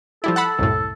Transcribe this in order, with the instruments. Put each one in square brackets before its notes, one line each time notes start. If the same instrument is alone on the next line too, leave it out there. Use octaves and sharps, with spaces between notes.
[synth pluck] F3 G3 E4 [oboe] A4
[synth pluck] F#5 A5 B5
C2 F#2 A2